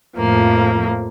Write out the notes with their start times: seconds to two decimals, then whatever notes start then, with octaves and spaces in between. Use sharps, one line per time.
0.16 F2 A2 F3 A#3